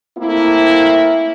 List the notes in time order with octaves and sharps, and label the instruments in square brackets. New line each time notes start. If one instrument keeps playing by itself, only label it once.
[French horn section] A3 A#3 C4 E4